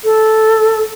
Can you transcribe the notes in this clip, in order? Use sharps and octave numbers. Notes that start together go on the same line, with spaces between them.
A4